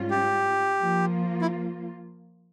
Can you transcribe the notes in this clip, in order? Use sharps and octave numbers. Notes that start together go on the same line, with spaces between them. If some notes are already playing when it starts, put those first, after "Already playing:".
Already playing: G#2 G3 C#4 F4
G4
F3 A#3 F4
E4